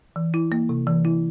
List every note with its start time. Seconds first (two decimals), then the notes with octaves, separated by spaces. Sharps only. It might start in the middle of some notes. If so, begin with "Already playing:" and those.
0.16 E3
0.34 E4
0.52 A#3
0.69 C3
0.87 E3
1.05 E4